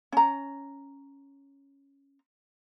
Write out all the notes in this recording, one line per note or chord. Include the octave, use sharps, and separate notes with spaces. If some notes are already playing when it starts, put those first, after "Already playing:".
C#4 A#5